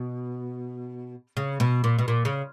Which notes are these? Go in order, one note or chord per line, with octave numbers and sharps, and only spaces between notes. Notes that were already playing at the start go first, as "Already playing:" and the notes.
Already playing: B2
C#3
B2
A#2
B2
A#2
C#3